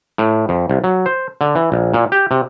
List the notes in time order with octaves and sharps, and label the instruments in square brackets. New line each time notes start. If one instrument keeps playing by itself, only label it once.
[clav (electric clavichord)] A2
F2
C2
F#3
C5
D3
E3
A#1
A#2
G4
C3